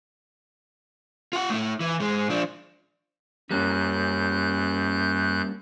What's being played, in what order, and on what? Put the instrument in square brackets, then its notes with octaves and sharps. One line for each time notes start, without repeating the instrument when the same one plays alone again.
[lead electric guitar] F4 F#5
A3 E4
E3
G#2 G#3
F3 D4
[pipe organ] F#2 F#6 G6 [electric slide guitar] G3 A#3 C#4